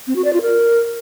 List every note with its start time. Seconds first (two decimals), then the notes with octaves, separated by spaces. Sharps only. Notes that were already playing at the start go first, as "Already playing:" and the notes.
0.07 C4
0.16 F#4
0.24 D5
0.33 F4
0.42 A#4